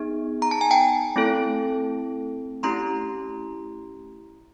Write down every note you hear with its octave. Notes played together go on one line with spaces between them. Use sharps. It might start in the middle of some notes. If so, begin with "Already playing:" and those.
Already playing: B3 D#4 G#4
A#5
A5
G#5
G5 A5
A3 C4 E4 A4
A3 C#4 E4 G4 A#5 C6